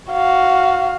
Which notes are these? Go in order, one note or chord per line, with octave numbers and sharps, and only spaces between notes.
F#4 F5